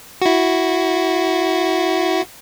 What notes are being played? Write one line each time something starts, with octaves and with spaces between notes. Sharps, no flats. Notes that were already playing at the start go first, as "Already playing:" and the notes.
E4 F#4